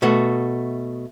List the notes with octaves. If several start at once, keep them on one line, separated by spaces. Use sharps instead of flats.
B2 A3 F#4